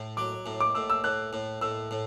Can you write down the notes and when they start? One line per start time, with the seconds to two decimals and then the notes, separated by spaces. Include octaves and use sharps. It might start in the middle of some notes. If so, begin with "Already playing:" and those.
Already playing: A2
0.17 F#3 D6
0.46 A2
0.60 D6
0.75 A2 E6
0.90 E6
1.04 A2 F#6
1.33 A2
1.61 A2 E6
1.91 A2